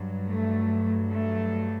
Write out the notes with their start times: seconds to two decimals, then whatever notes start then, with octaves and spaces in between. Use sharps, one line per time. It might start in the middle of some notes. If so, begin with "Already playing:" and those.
Already playing: G2 F#3
0.27 A3
1.12 A3